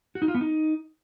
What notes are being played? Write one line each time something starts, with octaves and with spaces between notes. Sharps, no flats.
F#4
D#4
F4
B3
D#4